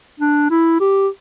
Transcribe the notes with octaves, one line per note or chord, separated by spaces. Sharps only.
D4
E4
G4